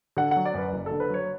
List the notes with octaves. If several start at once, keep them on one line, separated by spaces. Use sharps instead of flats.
D3 F#5
F#3 F#5
D5
F#2 B4
F#1
D3 A4
B4
F#3 C#5